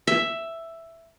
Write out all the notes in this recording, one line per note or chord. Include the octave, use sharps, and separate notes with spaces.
E5